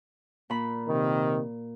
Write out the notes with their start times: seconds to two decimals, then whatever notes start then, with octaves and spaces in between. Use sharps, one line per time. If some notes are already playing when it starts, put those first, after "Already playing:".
0.50 A#2 B5
0.87 C3 D#3